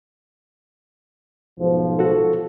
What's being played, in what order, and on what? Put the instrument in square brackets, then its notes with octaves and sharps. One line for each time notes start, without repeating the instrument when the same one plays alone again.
[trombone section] B1 G#2 F3
[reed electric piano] F#4 A4